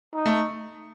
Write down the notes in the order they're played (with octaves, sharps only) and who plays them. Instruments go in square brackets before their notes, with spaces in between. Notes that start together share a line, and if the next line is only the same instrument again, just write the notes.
[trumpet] D#4
[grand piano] A3